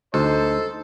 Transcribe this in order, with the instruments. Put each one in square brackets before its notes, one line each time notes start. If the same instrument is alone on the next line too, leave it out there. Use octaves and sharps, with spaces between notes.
[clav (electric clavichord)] D2 [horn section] D#4 C5 [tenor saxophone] A4